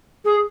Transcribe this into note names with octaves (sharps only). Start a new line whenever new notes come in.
G#4